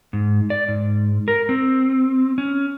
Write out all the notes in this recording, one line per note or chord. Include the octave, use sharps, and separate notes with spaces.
G#2
D5
G#2
A#4
C4
C#4